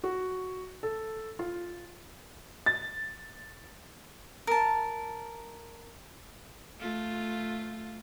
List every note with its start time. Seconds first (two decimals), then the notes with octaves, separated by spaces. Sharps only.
0.04 F#4
0.83 A4
1.39 F4
2.66 A6
4.47 A#4 A5
6.80 A3 F4